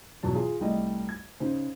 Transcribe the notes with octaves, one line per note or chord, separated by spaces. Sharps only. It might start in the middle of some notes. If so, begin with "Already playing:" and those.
E2 B2 F#3 A5
F4 G#4
C2 G3 A3 D#5
G#6
C#3 D#4 C5